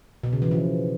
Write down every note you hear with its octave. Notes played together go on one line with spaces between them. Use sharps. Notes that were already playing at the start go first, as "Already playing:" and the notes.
B2
C#3
E3
F3